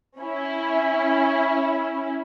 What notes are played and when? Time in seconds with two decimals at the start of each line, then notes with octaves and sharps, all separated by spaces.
0.20 C#4 E4